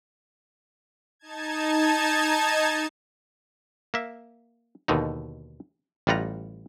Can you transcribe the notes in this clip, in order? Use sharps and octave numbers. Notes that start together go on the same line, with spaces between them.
D#4 A5 G#6
A#3 E5
D#2 B2 D3 D#4
A1 G3 F4 F#5 A#5